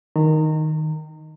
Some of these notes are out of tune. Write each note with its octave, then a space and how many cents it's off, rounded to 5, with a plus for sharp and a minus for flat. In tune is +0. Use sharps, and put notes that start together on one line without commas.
D#3 +0 A#5 -30